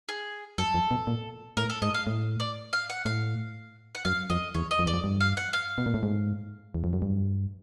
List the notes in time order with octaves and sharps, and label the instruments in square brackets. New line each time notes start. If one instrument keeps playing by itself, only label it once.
[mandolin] G#4
[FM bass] F#2 [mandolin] A4
[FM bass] F2
B2
A#2
[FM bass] A2 [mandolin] A#4
[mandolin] A4
[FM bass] G#2 [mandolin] D#5
[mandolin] F5
[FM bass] A2
[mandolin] D5
F5
F#5
[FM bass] A2 [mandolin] F5
[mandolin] F#5
[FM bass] F#2 [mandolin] F5
[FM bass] F2 [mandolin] D#5
[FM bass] E2 [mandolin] C#5
[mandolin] D#5
[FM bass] F2
[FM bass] E2 [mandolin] D5
[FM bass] F2
G2
[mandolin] F5
F#5
F5
[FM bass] B2
A#2
A2
G#2
E2
F2
F#2
G2